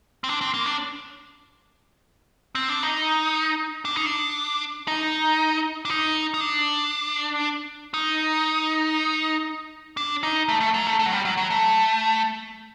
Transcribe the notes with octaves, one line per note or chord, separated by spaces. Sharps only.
C4
D4
C4
A#3
D4
C4
D4
D#4
D4
D#4
D4
D#4
D4
D#4
D#4
D4
D#4
D4
D#4
A3
A3
F#3
A3
A3
F#3
G3
F#3
F#3
A3